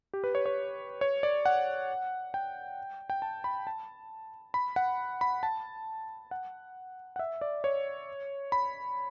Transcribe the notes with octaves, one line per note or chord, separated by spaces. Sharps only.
G4
B4
C#5
C#5
C#5
D5
F#5
G5
G5
A5
B5
A5
B5
F#5
B5
A5
F#5
F#5
E5
D5
C#5
B5